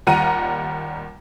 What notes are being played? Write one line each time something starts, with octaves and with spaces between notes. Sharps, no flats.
D#2 G3 F4 F#5 A#5 D#7